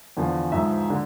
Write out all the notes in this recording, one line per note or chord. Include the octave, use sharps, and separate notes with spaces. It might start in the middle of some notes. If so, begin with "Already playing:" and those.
E2 D3 F3
G#2 F3 E5
D3